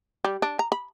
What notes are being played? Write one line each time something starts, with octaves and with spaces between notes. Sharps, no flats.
G3
D4
A#5
B5